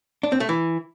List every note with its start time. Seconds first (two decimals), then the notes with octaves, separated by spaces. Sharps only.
0.23 D4
0.32 C4
0.40 A3
0.49 E3